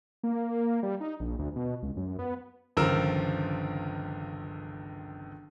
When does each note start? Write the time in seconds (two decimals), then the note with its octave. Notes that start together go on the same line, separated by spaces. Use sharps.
0.23 A#3
0.40 A#3
0.83 G3
1.00 D#4
1.20 A#1
1.39 D2
1.56 B2
1.83 C#2
1.97 F#2
2.19 B3
2.77 G1 C#2 D#3 F3 A#4 E6